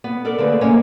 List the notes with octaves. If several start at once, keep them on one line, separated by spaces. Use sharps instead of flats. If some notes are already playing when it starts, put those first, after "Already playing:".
B3
A4 A#4 D5
D3 A3 A#3 C4 G#4 B4
F3 G#3 A#3 C#4 C#5